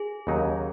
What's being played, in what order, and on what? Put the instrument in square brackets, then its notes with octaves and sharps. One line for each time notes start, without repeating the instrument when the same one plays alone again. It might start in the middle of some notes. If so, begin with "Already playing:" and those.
Already playing: [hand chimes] G#4
[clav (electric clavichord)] D#2 C#3 F#3 D#4